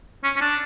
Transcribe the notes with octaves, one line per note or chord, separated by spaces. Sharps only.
C#4
C#4
D4